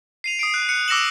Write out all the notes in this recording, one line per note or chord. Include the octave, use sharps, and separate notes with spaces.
C7 D#7 F7
D#6 C7 D7
F#6
F#6 C#7
D6 E6 A#6 C#7 E7 F#7